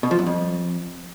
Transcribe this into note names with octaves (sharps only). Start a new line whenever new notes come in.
B2
F3
F#2
F2